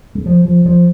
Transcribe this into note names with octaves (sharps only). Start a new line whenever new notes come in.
G#3
F3
F3
F3